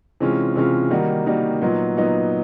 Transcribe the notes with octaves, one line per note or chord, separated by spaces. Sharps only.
C3 E3 G#3 C#4 F4
C3 E3 G#3 C#4 F4
D#3 G3 A#3 D#4 F#4
D#3 G3 A#3 D#4 F#4
A#2 F#3 B3 D#4
A#2 F#3 B3 D#4